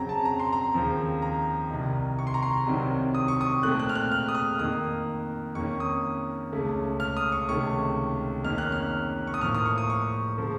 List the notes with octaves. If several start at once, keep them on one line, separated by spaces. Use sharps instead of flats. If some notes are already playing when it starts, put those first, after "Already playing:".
Already playing: F2 C#3 F#3 C4 A#5
A5
A#5
C6
A#5
D#2 C#3 F3 C4
A#5
C2 C3 D#3
C#6
C6
A#5
C6
C2 C3 D#3 F#3 C4
D#6
C#6
D#6
A#2 A3 C4 F#6
F#6
F6
F#6
F6
D#6
F6
F2 D#3 A#3 D#6
F2 D#3 A#3 C#4 C#6
D#6
C#2 C#3 A3 C#4
F6
D#6
C#6
C#2 C3 D#3 A3 C#4 C#6
F2 D#3 A#3 C#4 F6
F#6
F6
C#6
D#6
A2 F3 A#3 F6
D#6
C#6
D#6
C#6
C#3 F3 A3